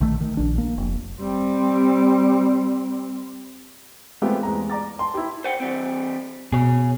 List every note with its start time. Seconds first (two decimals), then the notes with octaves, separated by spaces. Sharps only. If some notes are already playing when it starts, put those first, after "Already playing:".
0.01 A#1 D#3 A3
0.21 D#3
0.37 A#1 D4
0.58 A#3
0.78 F1
1.21 G3 C4
4.22 G#3 A3 B3 C4 F4 G4
4.43 E2 G#3 A#5
4.70 D5 A#5 D6 A6
4.99 A5 C6
5.14 E4 G4
5.44 C5 F#5 G5
5.60 E3 G3 C4
6.52 B2 G#4 C#5